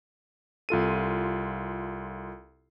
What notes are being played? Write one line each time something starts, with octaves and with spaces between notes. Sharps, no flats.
C2 F4 A4 D#7